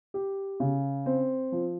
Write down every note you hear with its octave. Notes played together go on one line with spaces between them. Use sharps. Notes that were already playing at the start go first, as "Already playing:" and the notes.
G4
C#3
C4
F3